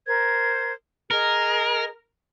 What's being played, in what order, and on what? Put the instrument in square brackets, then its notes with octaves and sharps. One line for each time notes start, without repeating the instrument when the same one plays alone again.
[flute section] A#4 C5 G#6
[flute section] G#4 D#5 [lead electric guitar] A#4